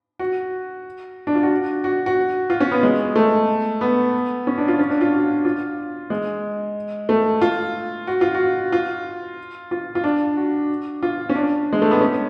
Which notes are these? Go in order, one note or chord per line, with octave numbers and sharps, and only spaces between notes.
F#4
D4
F4
F#4
F#4
F#4
F4
C#4
B3
G#3
A3
B3
C#4
D4
F4
C#4
D4
F4
F#4
F4
G#3
A3
F4
F#4
F4
F#4
F4
F4
F4
D4
F#4
F4
C#4
D4
G#3
A3
B3
C#4